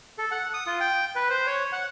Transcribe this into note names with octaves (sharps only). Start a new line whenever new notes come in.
A4
F#5
D#6
F4
G5
B4
C5
C#5
F#5